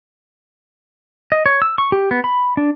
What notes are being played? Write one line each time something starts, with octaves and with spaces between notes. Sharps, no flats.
D#5
C#5
E6
C#6
G4
B3
B5
D4